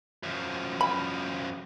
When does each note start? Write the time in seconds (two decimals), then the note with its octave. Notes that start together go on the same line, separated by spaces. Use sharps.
0.23 F#2 F3
0.81 B5